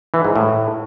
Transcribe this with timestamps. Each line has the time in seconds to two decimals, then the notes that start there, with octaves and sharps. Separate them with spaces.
0.14 E3
0.25 G#2
0.36 A2